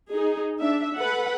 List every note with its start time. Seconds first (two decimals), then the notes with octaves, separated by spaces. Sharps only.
0.10 D#4 G#4
0.58 D4 E5
0.95 A4 B4 F#5 B5